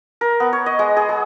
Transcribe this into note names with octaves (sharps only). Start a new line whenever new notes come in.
A#4
B3
C#5
D#5
G#3
G#4
G#4